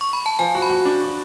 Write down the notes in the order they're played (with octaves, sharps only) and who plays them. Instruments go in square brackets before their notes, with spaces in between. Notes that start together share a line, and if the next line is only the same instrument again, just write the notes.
[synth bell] C#6
B5
A5
[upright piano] F3 [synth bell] G#5
[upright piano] F#4 [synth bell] A5
[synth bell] B5
[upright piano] F#4
D4
F#4